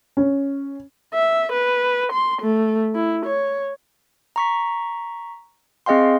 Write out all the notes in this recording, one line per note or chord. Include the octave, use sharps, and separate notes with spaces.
C#4
E5
B4
C6
A3
E4
C#5
A#5 C#6 B6
C4 G#4 D#5 F5 G5 C6